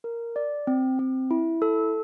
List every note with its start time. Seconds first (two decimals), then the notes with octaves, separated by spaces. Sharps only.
0.04 A#4
0.36 D5
0.67 C4
0.99 C4
1.31 E4
1.62 A4